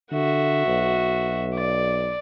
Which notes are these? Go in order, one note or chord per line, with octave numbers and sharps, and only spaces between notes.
D3 F#4 E5
B1
D5